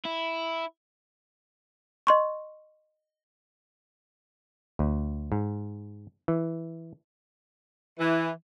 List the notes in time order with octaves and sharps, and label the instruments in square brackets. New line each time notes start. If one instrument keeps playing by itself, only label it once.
[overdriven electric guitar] E4
[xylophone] D#5 C6 C#6
[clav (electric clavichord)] D2
G#2
E3
[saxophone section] E3